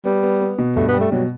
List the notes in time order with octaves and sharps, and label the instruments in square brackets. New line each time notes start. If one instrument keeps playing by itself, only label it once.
[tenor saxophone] G3 [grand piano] B3
[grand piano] B3
B3
B2
[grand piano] G2 [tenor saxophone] A3
[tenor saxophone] B3
[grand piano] G3
[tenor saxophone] A3
[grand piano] B2 [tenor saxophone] F#3